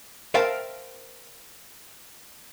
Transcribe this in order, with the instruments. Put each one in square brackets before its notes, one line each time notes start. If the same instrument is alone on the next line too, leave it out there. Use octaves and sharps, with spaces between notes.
[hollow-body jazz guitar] A#4 C5 E5 F5 G5 A5